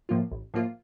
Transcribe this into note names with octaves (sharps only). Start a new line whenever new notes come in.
A2 F3 A#3 F4
A1
A2 F3 A#3 F4